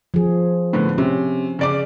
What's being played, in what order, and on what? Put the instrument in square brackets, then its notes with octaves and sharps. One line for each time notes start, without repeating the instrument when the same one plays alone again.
[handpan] F3 G#4
[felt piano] A2 D3 B3
[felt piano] C3 [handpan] C#4
[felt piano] C#3 D5 D6